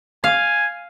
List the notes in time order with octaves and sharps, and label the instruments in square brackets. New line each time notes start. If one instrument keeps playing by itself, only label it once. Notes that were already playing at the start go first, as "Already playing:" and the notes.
[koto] F5 [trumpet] G#5